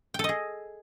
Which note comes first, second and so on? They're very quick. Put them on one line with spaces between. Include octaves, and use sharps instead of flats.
G5 A4 D#5 G#4